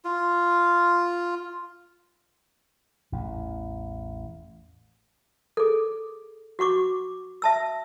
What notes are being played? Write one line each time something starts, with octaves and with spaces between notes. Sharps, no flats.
F4
A1 E2
G#4 A4
F#4 F#5 C#6 D6
E5 A5 E6